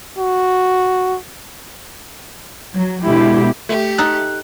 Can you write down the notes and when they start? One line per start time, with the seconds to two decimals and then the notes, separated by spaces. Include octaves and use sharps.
0.18 F#4
2.74 F#3
3.04 B2 D3 G#3 E4 G4
3.69 A3 G4
3.98 D#4 A4 F#6